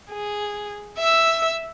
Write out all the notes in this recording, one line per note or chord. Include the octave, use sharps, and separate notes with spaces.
G#4
E5 E6